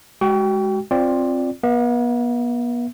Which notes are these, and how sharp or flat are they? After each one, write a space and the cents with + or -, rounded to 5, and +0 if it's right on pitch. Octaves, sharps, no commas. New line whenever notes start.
G#3 +0 F#4 +35 G5 +0
C4 +10 F4 +5 D5 +0
B3 -40 E5 +15